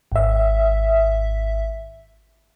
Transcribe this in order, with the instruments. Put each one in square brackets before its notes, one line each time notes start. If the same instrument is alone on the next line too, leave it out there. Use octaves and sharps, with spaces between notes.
[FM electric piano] G#1 E5